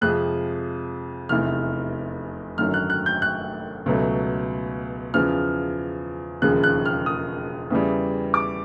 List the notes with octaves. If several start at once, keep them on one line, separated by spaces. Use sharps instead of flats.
F2 C3 F3 G#3 F#6
F1 E2 C3 E3 F6
G#1 F#2 D3 F#3 F6
F#6
F#6
G6
F#6
C#2 B2 F#3 A3
E2 C#3 F3 F6
E1 D#2 C#3 F3 G#3 F#6
F#6
F6
D#6
E2 C#3 E3 G3
D6